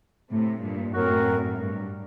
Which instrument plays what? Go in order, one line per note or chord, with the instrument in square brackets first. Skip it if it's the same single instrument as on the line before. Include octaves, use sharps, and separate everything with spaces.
[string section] A2 C3
G2 A#2
[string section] F#2 A2 [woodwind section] F#3 A3 C4 F#4 A#4
[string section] G2